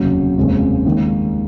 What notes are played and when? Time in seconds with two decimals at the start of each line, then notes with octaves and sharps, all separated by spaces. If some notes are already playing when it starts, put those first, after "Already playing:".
Already playing: F1 D#2 C#3 F#3 C#4
0.37 F1 D#2 C#3 G#3 C#4
0.85 D#2 D#3 G#3